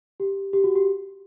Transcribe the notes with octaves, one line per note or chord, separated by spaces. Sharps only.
G4
G4
F#4
G4